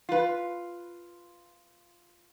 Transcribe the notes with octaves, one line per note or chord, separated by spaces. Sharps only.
F4 B4